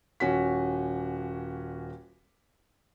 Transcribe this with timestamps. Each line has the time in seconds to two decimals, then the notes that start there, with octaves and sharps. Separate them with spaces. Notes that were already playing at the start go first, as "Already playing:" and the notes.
0.20 D#1 C#4 F#4 B6